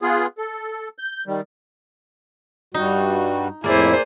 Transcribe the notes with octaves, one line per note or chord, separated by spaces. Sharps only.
B3 F4 G#4
A4
G6
D#3 G3
G2 G3 D#4 F#4
F2 A2 A#3 E4 G#4 C5 D5